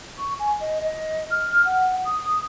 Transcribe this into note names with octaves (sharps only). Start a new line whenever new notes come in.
C#6
G#5
D#5
D#5
F6
F#5
D#6